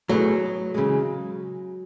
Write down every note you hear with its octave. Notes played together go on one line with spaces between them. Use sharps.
B2 F#3 A3 E4 G#4 B4
C#3 E3 G#3